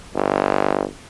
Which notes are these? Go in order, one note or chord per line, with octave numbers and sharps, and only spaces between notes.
G1